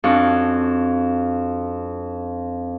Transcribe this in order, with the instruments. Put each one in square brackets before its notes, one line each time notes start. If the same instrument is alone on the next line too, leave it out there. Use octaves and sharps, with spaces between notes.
[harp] F2 C#4 D4 F#4